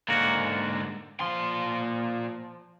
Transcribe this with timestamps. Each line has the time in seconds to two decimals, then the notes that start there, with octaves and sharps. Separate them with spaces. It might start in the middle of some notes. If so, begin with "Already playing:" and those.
0.08 G#2 D3 A#3 F#4
1.20 A#2 F3 C6